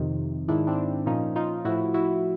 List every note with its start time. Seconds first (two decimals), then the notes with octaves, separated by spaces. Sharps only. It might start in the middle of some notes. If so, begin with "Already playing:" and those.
Already playing: F2 C3 D#3
0.48 G#2 D#3 D4 E4
0.67 C4 D4
1.06 A#2 F3 C#4 D#4
1.36 D#4 F4
1.65 A2 F3 E4 F#4
1.94 E4 F#4